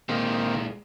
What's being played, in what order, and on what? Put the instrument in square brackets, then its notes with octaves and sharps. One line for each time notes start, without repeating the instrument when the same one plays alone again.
[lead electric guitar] A#2 G#3 [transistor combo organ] D#3 A#3 C4